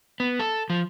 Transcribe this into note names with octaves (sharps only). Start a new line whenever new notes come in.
B3
A4
F3